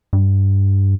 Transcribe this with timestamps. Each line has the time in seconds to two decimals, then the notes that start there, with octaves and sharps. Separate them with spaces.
0.13 G2